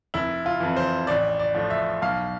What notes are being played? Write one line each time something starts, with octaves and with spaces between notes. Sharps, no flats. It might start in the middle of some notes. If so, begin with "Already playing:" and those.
F1 E4
F4
F2 E3
C5
A1 D5
D5
A2 F3
E5
B1 F5